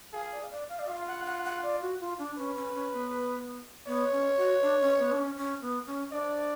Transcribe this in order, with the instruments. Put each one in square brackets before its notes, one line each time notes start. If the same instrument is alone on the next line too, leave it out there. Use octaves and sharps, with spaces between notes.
[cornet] G#4 [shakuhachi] F5
[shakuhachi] D5
F5
D5
F5
D5
[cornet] F4 [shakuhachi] F5
[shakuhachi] F#5
F#5
F#5
D5
F#4
F4
D4
[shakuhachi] C#4 [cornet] B4
[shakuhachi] C#4
C#4
B3
[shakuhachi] B3 [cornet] C#5
[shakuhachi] C#4
F#4
D4
C#4
B3
D4
C#4
C#4
B3
C#4
[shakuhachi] D4 [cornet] D5